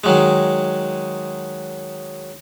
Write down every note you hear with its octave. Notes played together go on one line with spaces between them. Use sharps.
D#3 F#3 G#3